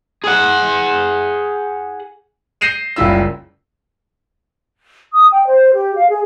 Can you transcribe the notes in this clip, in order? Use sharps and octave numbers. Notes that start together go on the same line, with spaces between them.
G#4 F#5
G6 A#6 C7 D#7 E7
F#1 C#2 G3 E4 F4 E6
D#6
G5
C5
G4
F5
G#4